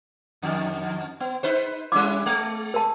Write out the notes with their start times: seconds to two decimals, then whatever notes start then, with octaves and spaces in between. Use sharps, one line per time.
0.42 F2 D#3
1.20 B3
1.43 D#4 B4 C5
1.92 G3 C#4 E4 D6
2.26 G#3
2.74 A#4 A5